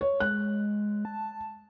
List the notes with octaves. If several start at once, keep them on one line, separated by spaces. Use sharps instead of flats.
C#5
G#3 F#6
A5